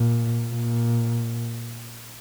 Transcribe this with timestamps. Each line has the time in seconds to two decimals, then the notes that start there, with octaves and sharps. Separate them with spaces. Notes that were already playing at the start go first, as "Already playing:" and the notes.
Already playing: A#2
0.48 A#2